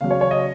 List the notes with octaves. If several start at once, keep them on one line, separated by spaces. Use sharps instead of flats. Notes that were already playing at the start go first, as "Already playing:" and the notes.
C#3 F#3 F5
C#5
C#5
D#5